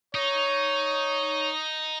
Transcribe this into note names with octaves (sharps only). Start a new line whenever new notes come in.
D#4 C#5